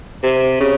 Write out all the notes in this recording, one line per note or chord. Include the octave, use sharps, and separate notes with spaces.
C3
C#3